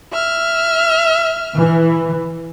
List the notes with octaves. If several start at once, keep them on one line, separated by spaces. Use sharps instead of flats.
E5 F6
E3